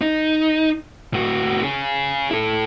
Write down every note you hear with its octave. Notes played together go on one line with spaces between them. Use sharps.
D#4
A2 F#4
C#4 G#4
E4 A4